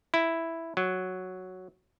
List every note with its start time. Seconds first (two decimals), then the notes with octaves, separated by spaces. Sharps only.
0.14 E4
0.77 F#3